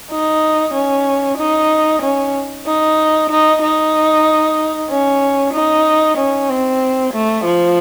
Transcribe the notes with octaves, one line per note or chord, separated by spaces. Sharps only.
D#4
C#4
D#4
C#4
D#4
D#4
D#4
C#4
D#4
C#4
C4
A3
F3